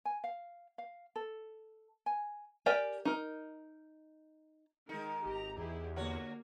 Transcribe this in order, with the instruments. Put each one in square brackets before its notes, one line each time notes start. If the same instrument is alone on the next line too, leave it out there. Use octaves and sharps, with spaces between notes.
[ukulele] G#5
F5
F5
A4
G#5
[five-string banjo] G4 A#4 D5 G5 G#5
D#4 A#4
[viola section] D#3 G#3 A#4 [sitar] D#4
[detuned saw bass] G#1 [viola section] G4 A#5
[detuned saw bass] E2 [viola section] E4 G4 G#4
[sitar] D3 F#4 C#5 [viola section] A#3